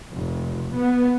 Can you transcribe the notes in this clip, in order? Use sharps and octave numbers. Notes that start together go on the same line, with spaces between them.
F1
B3